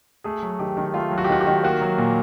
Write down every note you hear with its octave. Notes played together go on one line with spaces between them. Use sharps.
A3 G#4
F#3
D#3 G4
D#3
A3 F4
F#3
F#4
G4
D#3 F#4
G4
D#3
A#3 F#4
F#3
A#2